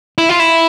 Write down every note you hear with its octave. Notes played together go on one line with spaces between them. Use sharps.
E4
F4
E4